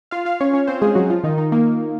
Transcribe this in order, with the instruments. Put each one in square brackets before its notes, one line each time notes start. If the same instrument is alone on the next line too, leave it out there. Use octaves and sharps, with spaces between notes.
[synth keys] F4 F5
F4 F5
C#4 C#5
C#4 C#5
C4 C5
G#3 G#4
F#3 F#4
F3 F4
D#3 D#4
D#3 D#4
A#3